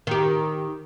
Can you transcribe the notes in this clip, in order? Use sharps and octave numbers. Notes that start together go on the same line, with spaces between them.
D#3 G4